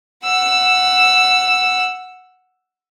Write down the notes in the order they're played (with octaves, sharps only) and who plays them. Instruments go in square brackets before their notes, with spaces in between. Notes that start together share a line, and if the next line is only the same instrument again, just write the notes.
[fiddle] F#5 E6